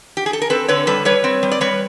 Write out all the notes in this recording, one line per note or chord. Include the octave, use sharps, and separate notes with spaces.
G4
G#4
A4
A#4
C4 A4 B4
D3 B4 C#5
G3 A4 B4
G3 B4 C#5
C4
G3
D5
G3 B4 C#5